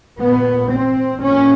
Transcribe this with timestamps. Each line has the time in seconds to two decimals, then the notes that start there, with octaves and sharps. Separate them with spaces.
0.20 A#2 B3
0.71 C4
1.22 A#2 C#4